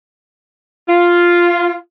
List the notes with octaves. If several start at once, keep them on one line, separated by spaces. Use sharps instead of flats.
F4